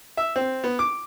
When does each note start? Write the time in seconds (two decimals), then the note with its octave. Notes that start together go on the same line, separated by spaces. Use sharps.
0.17 E5
0.36 C4
0.64 B3
0.79 D6